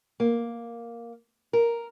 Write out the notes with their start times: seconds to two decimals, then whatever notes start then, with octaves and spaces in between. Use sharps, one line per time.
0.20 A#3
1.53 A#4